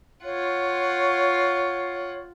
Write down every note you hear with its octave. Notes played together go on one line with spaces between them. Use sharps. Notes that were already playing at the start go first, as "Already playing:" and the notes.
F4 C#5 F#5